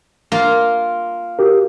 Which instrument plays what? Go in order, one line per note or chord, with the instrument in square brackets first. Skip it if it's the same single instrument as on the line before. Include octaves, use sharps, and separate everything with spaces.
[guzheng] A#3 F4 A#4
[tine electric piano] F#4 G4 A#4